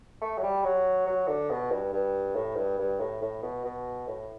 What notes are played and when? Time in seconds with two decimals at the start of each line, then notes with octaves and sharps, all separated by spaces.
0.21 A3
0.38 F#3
0.43 G3
0.64 F#3
1.07 F#3
1.28 D3
1.50 B2
1.71 G2
1.93 G2
2.36 A2
2.57 G2
2.79 G2
3.00 A2
3.22 A2
3.42 B2
3.65 B2
4.07 A2